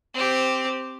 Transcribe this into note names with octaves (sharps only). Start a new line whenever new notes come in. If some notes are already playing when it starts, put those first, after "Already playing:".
C4 G4